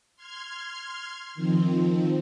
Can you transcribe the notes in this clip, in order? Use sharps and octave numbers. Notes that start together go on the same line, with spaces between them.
C6 F6 G#6
D#3 F3 C4